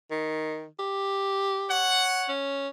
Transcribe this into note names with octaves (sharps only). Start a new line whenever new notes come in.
D#3
G4
C#5 F#5
C#4